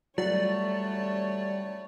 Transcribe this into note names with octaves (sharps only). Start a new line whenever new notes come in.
F#3 G3 A3 F#4 C#5 D5 F#5